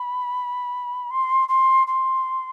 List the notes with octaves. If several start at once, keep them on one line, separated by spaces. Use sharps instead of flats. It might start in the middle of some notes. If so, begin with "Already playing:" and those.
Already playing: B5
C6
C6
C6